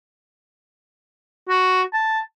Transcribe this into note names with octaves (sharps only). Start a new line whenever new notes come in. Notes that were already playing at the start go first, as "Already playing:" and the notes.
F#4
A5